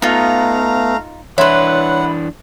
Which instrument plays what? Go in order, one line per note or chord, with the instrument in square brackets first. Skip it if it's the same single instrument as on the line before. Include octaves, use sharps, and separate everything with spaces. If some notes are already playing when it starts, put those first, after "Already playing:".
[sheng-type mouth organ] A3 F5 A#5 [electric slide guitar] B3 [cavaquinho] D#4 F4
[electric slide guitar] E3 D4 [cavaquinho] E4 B4 [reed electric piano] C#5 C6 [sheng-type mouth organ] F#5